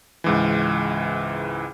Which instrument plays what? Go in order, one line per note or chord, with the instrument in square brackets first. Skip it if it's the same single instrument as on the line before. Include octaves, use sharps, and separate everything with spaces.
[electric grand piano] C#2 G#2 E3